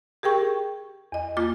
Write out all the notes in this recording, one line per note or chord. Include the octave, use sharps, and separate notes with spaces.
G4 G#4 A#4 G5 C#6
E2 D#5
A#3 F4 D6